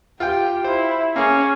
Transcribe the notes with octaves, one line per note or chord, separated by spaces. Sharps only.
F4 G4 F5 G5
E4 C5
A#3 C#4 G#4